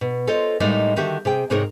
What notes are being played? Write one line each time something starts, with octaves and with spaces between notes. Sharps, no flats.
B2
F4 A4 C5 C#5 D#5
A2 G3 G#3 A#3 D#4 D5
D3 D#3 F#4 G4 E5
C3 G#4 G5
G#2 C3 D#4 G#4 A#4 C#5